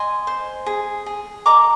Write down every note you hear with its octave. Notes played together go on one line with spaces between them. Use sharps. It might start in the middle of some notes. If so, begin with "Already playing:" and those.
Already playing: D#5 G#5 C6
C5
G#4
G#4
D#5 A#5 D6